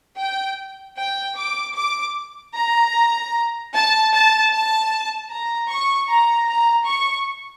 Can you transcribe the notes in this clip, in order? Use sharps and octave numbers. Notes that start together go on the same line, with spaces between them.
G5
G5
D6
D6
A#5
A5
A5
A5
A#5
C#6
A#5
A#5
C#6